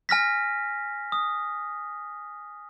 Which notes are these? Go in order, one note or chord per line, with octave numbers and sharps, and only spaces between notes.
G#5 F6 A#6 B6
D#6